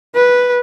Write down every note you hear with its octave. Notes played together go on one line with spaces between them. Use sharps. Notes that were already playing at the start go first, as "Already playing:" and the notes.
B4